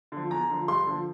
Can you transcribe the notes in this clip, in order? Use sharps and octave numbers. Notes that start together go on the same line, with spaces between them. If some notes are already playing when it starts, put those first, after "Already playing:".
D3 F3
E2 A#5
D3 F3
G2 C6
D3 F3